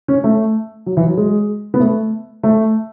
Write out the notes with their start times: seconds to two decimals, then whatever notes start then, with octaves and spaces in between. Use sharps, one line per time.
0.08 C#4
0.24 A3
0.86 F#3
0.97 E3
1.07 F#3
1.17 G#3
1.74 B3
1.80 A3
2.43 A3